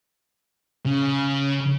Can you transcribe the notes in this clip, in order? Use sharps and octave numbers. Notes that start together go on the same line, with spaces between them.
C#3